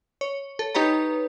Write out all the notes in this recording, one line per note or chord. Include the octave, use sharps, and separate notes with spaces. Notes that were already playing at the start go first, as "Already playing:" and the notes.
C#5
A4
D#4 G4 B4 C#5 A#5